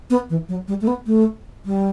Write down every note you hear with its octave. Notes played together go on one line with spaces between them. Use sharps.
B3
E3
F#3
G3
A3
B3
A3
G3